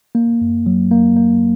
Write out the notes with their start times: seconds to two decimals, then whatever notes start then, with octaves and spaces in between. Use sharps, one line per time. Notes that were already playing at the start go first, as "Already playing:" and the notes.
0.15 A#3
0.41 F#2
0.66 F#3
0.91 A#3
1.17 A#3